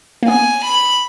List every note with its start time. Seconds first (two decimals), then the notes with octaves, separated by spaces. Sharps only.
0.23 A#3
0.28 B3 G#5
0.63 B5